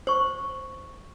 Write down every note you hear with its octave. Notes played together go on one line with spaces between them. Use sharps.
C5 C#6